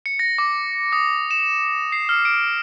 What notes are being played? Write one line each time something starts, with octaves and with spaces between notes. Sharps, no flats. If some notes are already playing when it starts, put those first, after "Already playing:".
C#7
A#6
D6
D#6
E7
C7
F6
D7